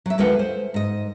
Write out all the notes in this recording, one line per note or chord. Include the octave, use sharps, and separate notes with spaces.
F#3 E5
D2 G#3 A#3 F4 B4 F#5
C5
G#2 D#5